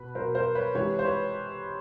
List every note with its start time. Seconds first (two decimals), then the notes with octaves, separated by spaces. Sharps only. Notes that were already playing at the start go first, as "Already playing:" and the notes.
Already playing: B2 B4
0.15 B2 F#3 A#4 C5
0.35 A#4 C5
0.55 B4 C#5
0.75 C3 E3 G#3 B4 C#5
0.99 C5
1.05 B4 C#5